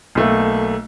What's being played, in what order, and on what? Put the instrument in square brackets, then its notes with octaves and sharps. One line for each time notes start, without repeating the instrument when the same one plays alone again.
[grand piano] B1 A3 A#3